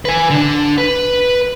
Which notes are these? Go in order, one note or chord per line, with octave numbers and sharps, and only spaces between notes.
B4 G#5
D3 D4
B4